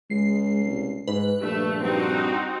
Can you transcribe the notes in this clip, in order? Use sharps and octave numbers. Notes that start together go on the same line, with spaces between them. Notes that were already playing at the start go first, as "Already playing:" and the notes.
C#2 G#3 C7
C2
G#2 B4
A#1 G2 A3
G2 C4 D#4 F#4